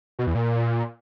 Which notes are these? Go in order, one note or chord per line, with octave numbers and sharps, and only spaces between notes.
B2
E2
A#2